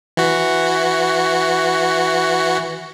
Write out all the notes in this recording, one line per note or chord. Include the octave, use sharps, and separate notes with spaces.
E3 F#4